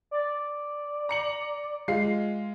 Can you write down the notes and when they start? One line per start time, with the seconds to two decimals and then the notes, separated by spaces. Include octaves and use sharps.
0.11 D5
1.09 A#5 C#7 F#7
1.88 G#3 F4 C7